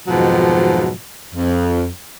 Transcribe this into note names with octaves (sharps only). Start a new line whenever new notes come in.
F2 G#2 B2 D#3 F3 F#3
F2